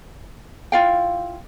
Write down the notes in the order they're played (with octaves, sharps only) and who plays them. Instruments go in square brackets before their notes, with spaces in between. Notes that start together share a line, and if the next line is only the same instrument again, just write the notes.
[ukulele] E4 F4 F5 G5